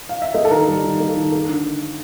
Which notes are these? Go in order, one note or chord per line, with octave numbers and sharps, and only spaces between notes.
F5
E5
A#3 D#5
A4
D#3 A#4
G3
D#3
A#3
D#3
A#3
D3